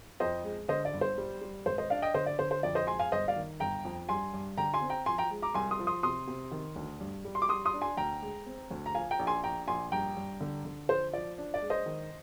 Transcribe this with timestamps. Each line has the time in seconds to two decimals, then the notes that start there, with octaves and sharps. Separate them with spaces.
0.20 F2 C5 D#5
0.44 G#3
0.68 D3 C5 D#5
0.85 D5
0.93 G1
1.01 C5
1.18 G3
1.41 G3
1.66 G#1 C5
1.78 C5 D#5
1.90 D4 D5 F5
2.02 D#5 G5
2.14 D3 C5 D#5
2.26 D5
2.39 D3 C5
2.51 C5
2.63 F2 D5
2.75 C5 D#5
2.87 G#3 G#5 C6
2.99 F5 G#5
3.12 G1 C5 D#5
3.28 D5 F5
3.36 D#3
3.60 G1 G5 A#5
3.85 F2
4.09 G2 G#5 C6
4.33 G2
4.58 D3 G5 A#5
4.74 G#5 C6
4.82 C4
4.90 G5 A#5
5.06 F3 G#5 C6
5.18 G5 A#5
5.31 G#3
5.42 A#5 D6
5.54 C2 G#5 C6
5.71 C6 D#6
5.79 F3
5.87 C6 D#6
6.03 C3 C6 D#6
6.27 C3
6.51 D#3
6.76 D2
7.01 G2
7.25 G3
7.35 C6
7.42 D6
7.49 G3 C6 D#6
7.65 C6 D#6
7.73 D4
7.82 G#5 C6
7.97 D2 G5 A#5
8.22 G#3
8.46 C4
8.71 D2
8.86 A#5
8.95 F3 F5 G#5
9.11 G5 A#5
9.19 A#1
9.27 G#5 C6
9.43 A#1 G5 A#5
9.68 A#1 G#5 C6
9.92 G2 G5 A#5
10.17 G2
10.41 D3
10.65 D3
10.89 F3 C5
11.13 F3 D5
11.38 D4
11.54 D5
11.62 G#3
11.70 C5 D#5
11.86 D#3